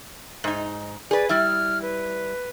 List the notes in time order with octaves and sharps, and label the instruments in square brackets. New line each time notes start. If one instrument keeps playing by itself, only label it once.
[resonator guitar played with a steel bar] G#2 D#4
[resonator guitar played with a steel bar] G#4 B4 [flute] D5
[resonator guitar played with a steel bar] G3 E4 [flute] F6
[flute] B4